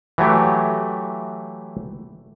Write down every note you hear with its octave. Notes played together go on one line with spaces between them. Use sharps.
E3 F#3 A3 G4